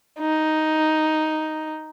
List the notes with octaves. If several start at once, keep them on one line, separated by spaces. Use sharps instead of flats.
D#4